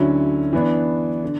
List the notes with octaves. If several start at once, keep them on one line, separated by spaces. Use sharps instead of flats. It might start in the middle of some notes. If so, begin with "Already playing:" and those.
Already playing: D2 D3 F#3 C#4 E4
E3 B3 D4
D3